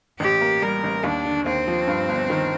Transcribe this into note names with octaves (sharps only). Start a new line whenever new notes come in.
A1 G4
A#3
G3 A#4
A1
D#2 D4
D3
D#2 C4
F3
G2
G1
D#3